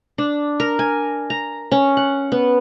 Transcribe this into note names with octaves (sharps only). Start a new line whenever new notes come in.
D4
A#4
G#5
A#5
C#4
F#5
B3